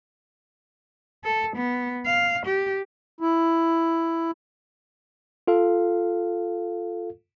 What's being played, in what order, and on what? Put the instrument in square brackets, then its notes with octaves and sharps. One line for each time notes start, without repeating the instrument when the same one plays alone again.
[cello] A4
B3
F5
G4
[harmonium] E4
[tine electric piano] F4 A4 F5